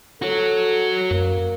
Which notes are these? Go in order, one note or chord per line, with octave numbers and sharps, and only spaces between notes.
F#4 A4 C#5
F#2 A#3